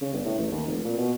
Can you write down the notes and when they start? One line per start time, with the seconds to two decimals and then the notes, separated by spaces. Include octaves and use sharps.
0.02 C#3
0.13 G1
0.25 A2
0.38 A1
0.52 D#2
0.67 F1
0.84 A#2
0.98 B2